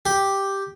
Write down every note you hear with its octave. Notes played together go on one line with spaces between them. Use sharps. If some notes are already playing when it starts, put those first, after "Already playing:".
G4